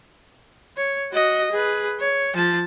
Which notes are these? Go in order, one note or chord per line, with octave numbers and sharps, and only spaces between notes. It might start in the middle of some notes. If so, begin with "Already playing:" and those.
C#5
F#4 D#5
G#4 B4
C#5
F3 A5